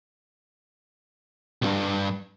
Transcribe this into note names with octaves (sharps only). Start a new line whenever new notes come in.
B1 G2